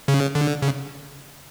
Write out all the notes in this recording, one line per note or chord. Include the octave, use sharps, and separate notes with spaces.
C#3
D3
C#3